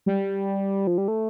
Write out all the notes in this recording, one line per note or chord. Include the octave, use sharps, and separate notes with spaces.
G3
F3
G3
A3